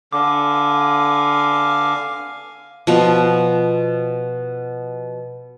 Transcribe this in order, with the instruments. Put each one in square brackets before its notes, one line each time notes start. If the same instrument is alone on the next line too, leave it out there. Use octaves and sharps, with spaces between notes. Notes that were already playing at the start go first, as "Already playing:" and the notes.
[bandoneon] D3 [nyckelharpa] F5 G#5 [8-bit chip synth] D6
[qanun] B2 F3